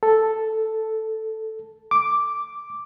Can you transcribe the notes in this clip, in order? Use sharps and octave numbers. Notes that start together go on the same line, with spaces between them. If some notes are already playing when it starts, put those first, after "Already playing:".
A4
D6